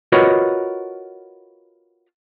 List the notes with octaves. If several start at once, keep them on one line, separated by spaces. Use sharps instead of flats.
F4 F#4 A#4 B4 C#5 D#5